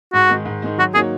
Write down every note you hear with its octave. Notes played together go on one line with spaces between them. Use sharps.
G#2 F#4
D#3 G#3 D#4
G#2
D#3 G#3 D#4
F#3 F#4
A#3 D#4 F#4 G#4 C#5